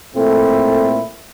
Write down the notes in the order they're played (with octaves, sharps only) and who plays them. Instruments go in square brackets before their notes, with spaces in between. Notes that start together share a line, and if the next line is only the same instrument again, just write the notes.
[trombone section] A#2 A3 C4 E4 [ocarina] A4